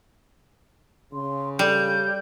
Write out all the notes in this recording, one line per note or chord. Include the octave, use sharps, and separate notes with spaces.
C#3 C6
G3 A4 G6